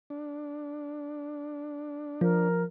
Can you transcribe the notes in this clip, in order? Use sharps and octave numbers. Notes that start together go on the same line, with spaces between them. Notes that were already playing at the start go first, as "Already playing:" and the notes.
D4
F3 A#4